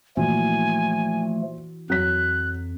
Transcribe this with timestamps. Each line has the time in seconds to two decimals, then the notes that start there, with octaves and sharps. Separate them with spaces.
0.17 A#2 E3 F3 A3 F#4 G#5
1.90 F2 F#3 F#6 B6